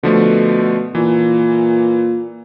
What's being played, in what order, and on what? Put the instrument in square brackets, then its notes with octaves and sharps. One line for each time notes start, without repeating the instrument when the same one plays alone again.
[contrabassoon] B2 [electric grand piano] D3 F3 A3
[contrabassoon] A#2 [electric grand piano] E3